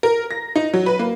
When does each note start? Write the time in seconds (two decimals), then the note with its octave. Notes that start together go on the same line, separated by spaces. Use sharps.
0.03 A#4
0.31 A#6
0.56 D#4
0.74 F#3
0.86 B4
0.99 A#3